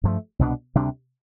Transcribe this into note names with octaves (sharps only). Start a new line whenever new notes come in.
G2 F3 A3
C2 B2 B3 D4
D2 C3 G3 D4